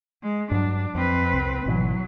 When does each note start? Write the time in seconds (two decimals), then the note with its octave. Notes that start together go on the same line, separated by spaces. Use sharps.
0.22 G#3
0.51 G2 F#3 D4
0.95 F2 C4 B4
1.33 C2
1.66 G#1 B2 E3 F#3